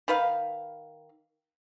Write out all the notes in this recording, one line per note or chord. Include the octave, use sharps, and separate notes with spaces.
D#3 B4 F5